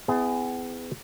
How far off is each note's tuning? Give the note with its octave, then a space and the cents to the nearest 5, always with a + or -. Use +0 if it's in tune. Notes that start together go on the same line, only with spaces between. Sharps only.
B3 +35 E4 +0 G#4 +0